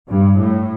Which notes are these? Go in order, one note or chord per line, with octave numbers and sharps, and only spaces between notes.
G2
A2